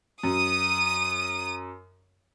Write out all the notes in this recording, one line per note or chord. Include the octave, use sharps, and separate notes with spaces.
F#2 D#6 D#7